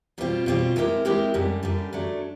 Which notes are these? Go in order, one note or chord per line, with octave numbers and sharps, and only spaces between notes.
B2 G3 C4 F4
B2 G3 C4 F4
G#3 C4 E4 G4 A#4
G#3 C4 E4 G4 A#4
F#2 D3 G3
F#2 D3 G3
F#3 A3 D4